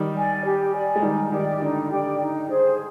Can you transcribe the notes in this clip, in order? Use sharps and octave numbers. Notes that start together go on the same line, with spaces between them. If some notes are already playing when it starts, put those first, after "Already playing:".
Already playing: D#3 G3
D5 G#5
G4
D5 G#5
G#3
D#3 G3 D#4
D#3 G4 D5 G5
D3 D#4
G4 D5 G5
D#4
G#4 C5